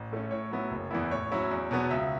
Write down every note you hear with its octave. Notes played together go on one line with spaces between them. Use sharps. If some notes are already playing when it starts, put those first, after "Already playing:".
Already playing: A1
A2 A3 C#4
A2 C#5
F#3 B3 E4
F#1
E2 E3 B3 E4
A2 C#5
F#3 C#4 E4
E2
B2 F#3 B3
C#2 E5